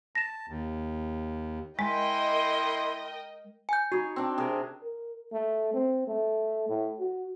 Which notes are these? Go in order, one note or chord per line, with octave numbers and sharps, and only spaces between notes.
A5 A#6 E7
D#2
G#3 E4 A#4 D#5 G5 C6
G#5 G6
D#4 F#4 C#5
C4 D4 G5
C3 G#4 A#4
A#4
A3
C4
A3
A2
F#4